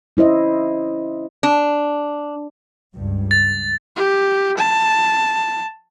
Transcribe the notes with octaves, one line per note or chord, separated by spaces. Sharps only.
C#4 E4 C5 D#5 E5
D4
C#2 G2
A6
G4
A5